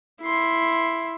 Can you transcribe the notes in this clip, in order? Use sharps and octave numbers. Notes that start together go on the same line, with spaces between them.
E4 C6